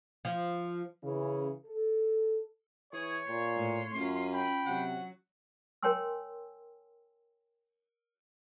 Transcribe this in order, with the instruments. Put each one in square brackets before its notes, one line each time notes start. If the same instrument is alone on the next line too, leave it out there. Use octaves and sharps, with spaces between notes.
[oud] F3
[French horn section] C#3 E3
A4
[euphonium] E3 [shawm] G#4 [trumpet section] C#5
[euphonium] A#2 [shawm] C6
[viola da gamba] A2
[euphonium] F#2 [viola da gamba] C#4 F4
[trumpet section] G5 B5
[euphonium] C3 [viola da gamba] F#3 [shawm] F#5
[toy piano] A#4 C#5 G5 G#5 C6 E6